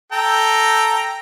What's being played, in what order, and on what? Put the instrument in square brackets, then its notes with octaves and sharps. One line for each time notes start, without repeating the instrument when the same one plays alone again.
[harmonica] A4 G5 A#5